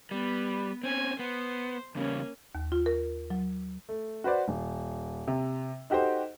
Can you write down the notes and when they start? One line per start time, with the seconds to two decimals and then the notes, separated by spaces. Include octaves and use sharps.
0.11 G3 B3 B4
0.84 C4 C#4 G#5
1.19 B3 C5
1.95 E2 C#3 G3 A#3 C#4
2.55 D#2
2.72 F4
2.86 A#4
3.30 F#3
3.89 A3
4.24 F#4 B4 C5 D5
4.48 D#1
5.28 C3
5.90 D#4 F#4 G4 A4 C5